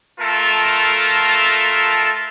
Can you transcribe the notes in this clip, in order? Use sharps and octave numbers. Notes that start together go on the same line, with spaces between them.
A3 F4 A4 A#4 A5